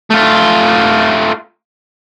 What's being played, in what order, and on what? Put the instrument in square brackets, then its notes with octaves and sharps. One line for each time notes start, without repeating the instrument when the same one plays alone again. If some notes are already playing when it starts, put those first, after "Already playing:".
[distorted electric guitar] A3 F4